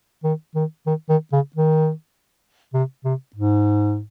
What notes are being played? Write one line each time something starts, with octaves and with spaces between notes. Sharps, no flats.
D#3
D#3
D#3
D#3
C#3
D#3
C3
C3
G#2